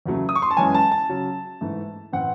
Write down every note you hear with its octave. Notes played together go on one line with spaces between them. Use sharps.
E2 C#3 F#3 A3
D#6
C#6
C6
A5
F#2 E3 G#3 C#4 G#5
A5
A5
C#3 F#3 C#4
G#2 E3 A3
A2 E3 C4 F#5